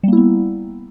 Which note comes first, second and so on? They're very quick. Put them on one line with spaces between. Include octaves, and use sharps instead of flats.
G3 A#3 E4 B3